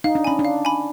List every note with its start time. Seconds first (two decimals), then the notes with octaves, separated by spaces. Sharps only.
0.04 D#4 F5
0.15 D4
0.24 C#4 G#5 B5
0.39 D4
0.45 F5
0.65 G#5 B5